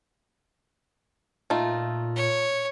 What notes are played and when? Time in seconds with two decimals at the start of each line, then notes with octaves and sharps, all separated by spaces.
1.50 A#2 A3 D#4 F4
2.16 C#5